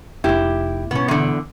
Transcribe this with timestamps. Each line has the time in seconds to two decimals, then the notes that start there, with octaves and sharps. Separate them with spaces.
0.24 F1 D#4 E4 G4
0.91 G2 B2 B3 C#4
1.08 E2 D3